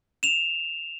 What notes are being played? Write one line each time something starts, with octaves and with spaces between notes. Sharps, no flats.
E7 F7